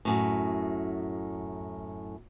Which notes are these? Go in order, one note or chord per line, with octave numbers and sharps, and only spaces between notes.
F#2 A2